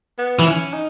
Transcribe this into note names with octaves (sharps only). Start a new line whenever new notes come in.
B3
E3
C#4
D#4